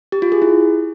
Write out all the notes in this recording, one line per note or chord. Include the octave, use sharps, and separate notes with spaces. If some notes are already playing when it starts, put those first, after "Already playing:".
G4
F4
G#4
E4